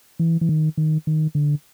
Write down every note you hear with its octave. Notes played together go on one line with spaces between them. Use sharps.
E3
E3
D#3
D#3
D#3
D3